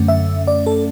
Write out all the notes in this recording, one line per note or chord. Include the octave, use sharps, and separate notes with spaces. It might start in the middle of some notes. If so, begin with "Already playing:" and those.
Already playing: F#2 D3 A3 C#4
E5
D5
A4